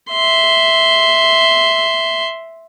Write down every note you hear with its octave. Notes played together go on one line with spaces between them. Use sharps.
E5 C6